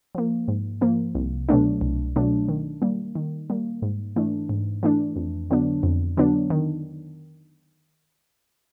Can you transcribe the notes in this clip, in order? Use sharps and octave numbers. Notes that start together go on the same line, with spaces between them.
F3 A#3
G#2
F3 A#3
C2
B2 F#3 A3 D4
C2
B2 F#3 A3 D4
D#3
G3 A#3
D#3
G3 A#3
G#2
E3 A3 D4
G#2
E3 A3 D4
F2
D3 F#3 B3 D4
F2
D3 F#3 B3 D4
D#3